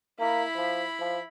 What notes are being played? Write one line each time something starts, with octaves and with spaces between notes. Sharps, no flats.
A#3 E4 B5
F3
F3